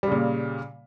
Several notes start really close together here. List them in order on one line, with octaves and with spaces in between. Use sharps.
G3 C#3 A#2